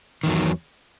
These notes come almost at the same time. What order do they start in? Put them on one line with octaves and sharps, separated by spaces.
D#3 E2 F#3